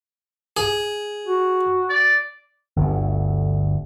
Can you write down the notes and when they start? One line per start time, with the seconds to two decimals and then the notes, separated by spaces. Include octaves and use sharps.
0.57 G#4
1.25 F#4
1.89 D5
2.76 G1 D2